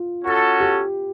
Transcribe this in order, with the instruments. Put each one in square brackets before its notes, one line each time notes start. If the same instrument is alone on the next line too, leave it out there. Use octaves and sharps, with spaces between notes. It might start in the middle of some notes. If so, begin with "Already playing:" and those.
Already playing: [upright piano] F4
[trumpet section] C#4 F#4 A4
[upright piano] G4